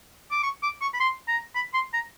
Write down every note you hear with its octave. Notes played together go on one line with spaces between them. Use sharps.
D6
C#6
D6
C#6
B5
C6
A#5
B5
C6
A#5